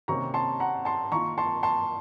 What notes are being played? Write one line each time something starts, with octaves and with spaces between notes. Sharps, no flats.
C3 D#3 A#3 C#4 A#5 C#6
A5 C6
F#5 A#5
A5 C6
D#3 A#3 F4 A#5 C#6
A5 C6
A5 C6